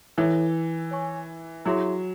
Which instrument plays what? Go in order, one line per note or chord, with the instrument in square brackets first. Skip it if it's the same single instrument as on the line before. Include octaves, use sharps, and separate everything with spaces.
[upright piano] E3 [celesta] E4 A4 C#5 E5
[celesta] C#5 G#5 C#6
[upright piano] F#3 [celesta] E4 G#4 C#5 E5 C6